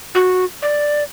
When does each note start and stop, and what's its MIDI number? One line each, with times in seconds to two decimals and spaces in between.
0.15 0.44 66
0.62 1.03 74